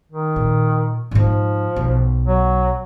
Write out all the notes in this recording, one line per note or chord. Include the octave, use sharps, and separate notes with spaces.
D#3
A#2
G#2 F3 D#4
B1
F#3